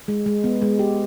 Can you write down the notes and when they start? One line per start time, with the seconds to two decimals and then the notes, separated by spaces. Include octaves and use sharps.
0.08 G#3
0.26 G#3
0.44 B3
0.62 G#3
0.79 G4